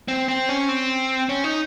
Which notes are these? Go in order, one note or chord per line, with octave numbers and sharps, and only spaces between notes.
C4
C4
C#4
C4
C#4
D#4